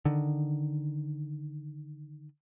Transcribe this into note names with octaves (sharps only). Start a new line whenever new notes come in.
D3 D#3